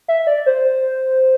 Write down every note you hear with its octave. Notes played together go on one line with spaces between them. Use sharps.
E5
D5
C5